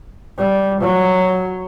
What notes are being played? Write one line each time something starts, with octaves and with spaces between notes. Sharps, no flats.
G3
F#3